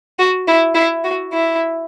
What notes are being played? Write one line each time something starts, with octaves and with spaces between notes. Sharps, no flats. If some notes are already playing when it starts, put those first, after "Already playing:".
F#4
E4
E4
F#4
E4